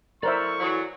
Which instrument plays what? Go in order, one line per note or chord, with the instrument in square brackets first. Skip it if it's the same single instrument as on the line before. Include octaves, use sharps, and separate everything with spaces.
[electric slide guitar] E4 A4 D5 [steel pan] A#4 C5 E5 [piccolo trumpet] C#6
[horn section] E3 F#3